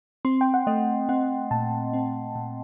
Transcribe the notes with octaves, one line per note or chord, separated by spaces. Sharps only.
C4 C6
G5
F#5
A3 D#5
C4 F#5
A#2 A5
C4
A#2